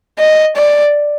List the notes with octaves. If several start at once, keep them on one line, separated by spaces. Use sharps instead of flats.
D#5
D5